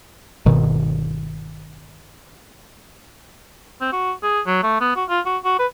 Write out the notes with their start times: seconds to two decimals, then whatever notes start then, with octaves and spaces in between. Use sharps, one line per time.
0.46 G1 B2 D#3
3.81 C4
3.93 F#4
4.23 G#4
4.47 F#3
4.63 A3
4.81 B3
4.96 F#4
5.09 F4
5.26 F#4
5.45 F#4
5.59 B4